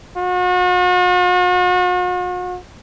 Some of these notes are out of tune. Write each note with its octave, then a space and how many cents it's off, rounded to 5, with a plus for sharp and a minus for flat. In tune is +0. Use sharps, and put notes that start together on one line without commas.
F#4 -45